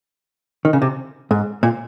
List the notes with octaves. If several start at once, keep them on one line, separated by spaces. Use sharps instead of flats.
D#3
C#3
C3
G#2
A#2